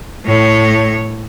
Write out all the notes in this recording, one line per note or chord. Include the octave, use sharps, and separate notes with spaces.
A2 C#5